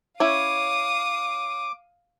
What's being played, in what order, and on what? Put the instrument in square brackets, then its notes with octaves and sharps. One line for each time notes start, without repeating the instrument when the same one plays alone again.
[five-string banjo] C#4 E4 C#5 [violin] F5 D#6 [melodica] D6